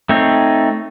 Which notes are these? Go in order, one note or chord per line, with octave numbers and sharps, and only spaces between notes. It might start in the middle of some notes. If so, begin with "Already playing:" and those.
A3 C4 D#4 C#5